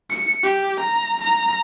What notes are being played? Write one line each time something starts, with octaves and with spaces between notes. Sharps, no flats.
C#7
G4
A#5
A#5